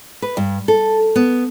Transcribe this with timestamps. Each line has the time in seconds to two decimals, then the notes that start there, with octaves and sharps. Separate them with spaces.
0.22 B4
0.37 G2
0.68 A4
1.16 B3